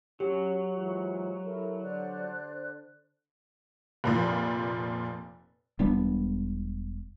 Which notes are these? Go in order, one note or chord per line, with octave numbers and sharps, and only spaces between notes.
F#3 C#4 G4
G#2 E3 F4
E4 A4 A#4
D3 C5 D5 F#6
F1 A#2 F3
E1 G3 B3 D4